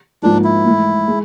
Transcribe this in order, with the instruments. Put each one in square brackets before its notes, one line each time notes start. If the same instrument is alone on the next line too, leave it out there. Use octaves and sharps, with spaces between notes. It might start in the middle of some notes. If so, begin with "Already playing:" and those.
[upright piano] G#2 F3 A#3 D#4 [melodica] D4
[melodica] E4
[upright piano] G#2 E3 A3
G#3